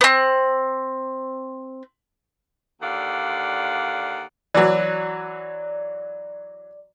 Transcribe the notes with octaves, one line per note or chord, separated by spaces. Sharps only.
B3 C4
D#2 D3 D5 F5 F#5
E3 F#3 D5